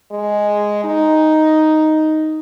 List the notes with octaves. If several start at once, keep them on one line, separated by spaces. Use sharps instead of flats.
G#3
D#4